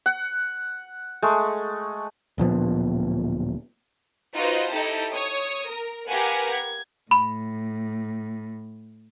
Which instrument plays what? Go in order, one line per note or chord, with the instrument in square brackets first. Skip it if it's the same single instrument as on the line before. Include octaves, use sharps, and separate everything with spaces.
[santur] F#5
G#3 A3
[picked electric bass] D1 A#2 F3 B3
[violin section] D#4 F4 F#4 B4 C5 D#5
D#4 E4 G4 A4 A5
C#5 D#6
A#4
G4 A#4 B4 F5 F#5 G#5
G#6
[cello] A2 [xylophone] B5